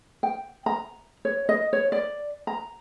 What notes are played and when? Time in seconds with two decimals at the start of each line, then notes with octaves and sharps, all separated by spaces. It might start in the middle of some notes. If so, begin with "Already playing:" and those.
0.23 G5
0.66 A#5
1.25 C#5
1.49 D#5
1.73 C#5
1.92 D5
2.47 A#5